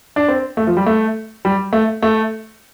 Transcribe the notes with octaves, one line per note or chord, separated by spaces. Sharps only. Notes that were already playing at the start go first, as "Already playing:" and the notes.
D4
C4
A3
F3
G3
A3
G3
A3
A3